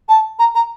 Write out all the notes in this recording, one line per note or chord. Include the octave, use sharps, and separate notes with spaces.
A5
A#5
A#5